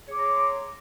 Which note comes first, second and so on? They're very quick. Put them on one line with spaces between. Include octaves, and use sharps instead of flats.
G#4 C#5 D6 C6 A#5